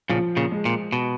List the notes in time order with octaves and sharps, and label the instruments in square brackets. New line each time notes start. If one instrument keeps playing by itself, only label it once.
[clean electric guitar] A#2 C#3 [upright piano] F3
[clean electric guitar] A#2 C#3
[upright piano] G#3
[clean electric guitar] A#2
B2